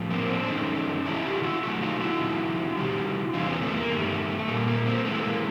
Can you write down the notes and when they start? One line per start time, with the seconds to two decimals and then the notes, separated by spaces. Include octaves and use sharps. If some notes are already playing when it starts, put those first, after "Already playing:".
Already playing: A2 F3
0.11 A#3 C4
0.29 C4 D4
0.44 D4
0.48 F#2 D#3 G#3 C#4 D#4
1.05 C3 E3 G#3 D4 E4
1.25 F4 G4
1.43 E4 F#4
1.63 B2 F#3 A3 E4 F#4
1.82 D#4 F4
2.01 E4 F#4
2.20 F2 C3 D#3
2.77 C3 D#3 G3
3.34 E2 C3 E3 D#4 F4
3.42 D4
3.48 B3 C#4
3.62 A3 B3
3.77 A#3
3.90 G2 D#3 G3 A3
4.48 A#2 G3 A#3
4.67 A#3
4.86 A#3 C4
5.04 C3 E3 G#3 A3 B3
5.16 B3
5.23 A#3